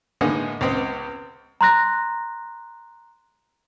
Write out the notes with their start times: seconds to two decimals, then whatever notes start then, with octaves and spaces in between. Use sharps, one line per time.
0.21 A2 D3 G#3 A#3 B3 D#4
0.61 C#2 B3 C4 D#5
1.61 A#5 C6 F#6 A#6